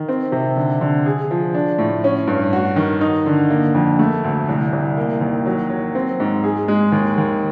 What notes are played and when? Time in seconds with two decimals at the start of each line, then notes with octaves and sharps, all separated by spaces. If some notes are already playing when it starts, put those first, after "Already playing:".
Already playing: D#3
0.08 C4
0.32 C3
0.56 D3
0.81 D3
1.06 G#4
1.31 F3
1.54 D4
1.79 A2
2.04 C#4
2.27 G2
2.53 F#4
2.76 D#3
3.01 D#4
3.26 D3
3.50 A#3
3.74 F2
3.99 A3
4.24 D2
4.49 C2
4.73 C2
4.98 A#3
5.21 D#2
5.46 F#3
5.70 F#3
5.95 C4
6.20 G#2
6.44 G#4
6.68 G#3
6.92 D#2
7.18 D#2